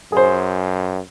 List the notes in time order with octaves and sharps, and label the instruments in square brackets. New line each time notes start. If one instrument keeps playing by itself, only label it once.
[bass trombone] F#2 [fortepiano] G#4 C5